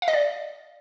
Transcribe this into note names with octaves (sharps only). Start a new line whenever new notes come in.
F5
D#5
D5